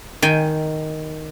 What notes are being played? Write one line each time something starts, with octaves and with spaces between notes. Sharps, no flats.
D#3 G5 G#5